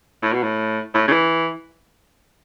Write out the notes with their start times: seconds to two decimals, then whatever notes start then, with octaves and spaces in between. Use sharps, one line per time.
0.22 A2
0.33 B2
0.43 A2
0.94 A2
1.08 C#3
1.12 E3